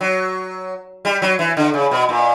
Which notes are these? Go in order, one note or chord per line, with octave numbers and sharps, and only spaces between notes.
F#3
G3
F#3
E3
D3
C#3
B2
A#2